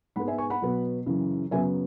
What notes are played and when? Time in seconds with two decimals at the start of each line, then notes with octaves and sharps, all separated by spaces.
0.16 G#2 G#3 B3 F#5 B5
0.28 E5 G#5
0.38 G#5 C#6
0.50 F#5 B5
0.61 B2 F#3 B3
1.06 F#2 C#3 E3
1.51 F#2 C#3 F#3 B3 E5 G#5